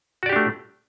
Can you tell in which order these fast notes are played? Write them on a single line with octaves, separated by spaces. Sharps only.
F#4 D5 G4 D4 A3